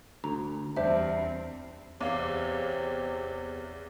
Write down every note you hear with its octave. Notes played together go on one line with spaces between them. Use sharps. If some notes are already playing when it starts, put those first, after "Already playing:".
D2 A#5
E2 G3 C4 D4 C5 E5
E2 C3 C#5 F5 D6